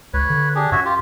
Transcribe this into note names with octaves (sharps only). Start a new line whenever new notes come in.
C#2 B4 C#5
D3
D4 G4 G#4
F#2 F#4 C#5 E5
F4 G4